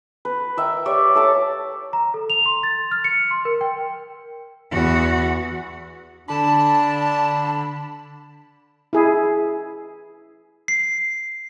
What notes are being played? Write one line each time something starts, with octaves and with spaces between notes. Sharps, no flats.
B4
A#4 E5 G5
G4 C#5 D5 E5
A4 E5 A5 D6
A#5
A4
F7
C6
A6
F6
C#7
C6
A#4
G5
E2 F#4
D3 D4 A5 B5
E4 G#4
C7